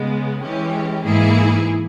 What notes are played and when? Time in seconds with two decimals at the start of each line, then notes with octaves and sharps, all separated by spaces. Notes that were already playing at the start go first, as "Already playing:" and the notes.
Already playing: C#3 G#3 B3
0.41 E3 G#3 C#4 G4
1.04 G#2 E3 A#3 E4 G#4